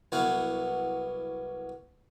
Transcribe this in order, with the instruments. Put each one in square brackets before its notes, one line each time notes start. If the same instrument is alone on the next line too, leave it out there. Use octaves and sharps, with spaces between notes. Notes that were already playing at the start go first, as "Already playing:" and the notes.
[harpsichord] C2 F#3 B3 E4 F5 F#5